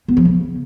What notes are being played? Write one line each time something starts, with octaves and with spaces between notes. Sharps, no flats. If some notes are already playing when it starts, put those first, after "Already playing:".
B3
F3
C#3